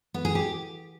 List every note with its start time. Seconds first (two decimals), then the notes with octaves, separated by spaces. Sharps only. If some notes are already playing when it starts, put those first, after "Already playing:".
0.14 B3
0.25 G#4
0.35 G4